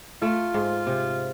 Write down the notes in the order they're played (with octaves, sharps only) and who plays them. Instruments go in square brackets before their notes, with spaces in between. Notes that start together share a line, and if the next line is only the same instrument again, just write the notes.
[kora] A3 [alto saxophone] F4
[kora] G#2
C3